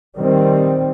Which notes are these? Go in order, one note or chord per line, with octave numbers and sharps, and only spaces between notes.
D#3 G3 C4